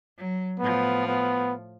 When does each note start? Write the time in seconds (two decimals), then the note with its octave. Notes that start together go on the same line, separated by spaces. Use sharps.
0.16 F#3
0.59 A2 F3 B3
1.07 B3